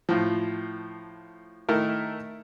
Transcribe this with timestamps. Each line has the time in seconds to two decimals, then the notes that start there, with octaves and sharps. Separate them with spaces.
0.09 A2 F3
1.69 D#3 A3 E4 A#4